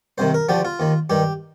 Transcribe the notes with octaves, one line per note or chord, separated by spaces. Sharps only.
C2 C3 D#3 C5
A#4
D2 D3 F3 G4
F4
D#2 D#3
G2 D#3 G4